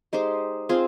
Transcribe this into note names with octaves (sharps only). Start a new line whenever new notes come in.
G#3 D#4 G4 C5
C4 F4 G#4 C5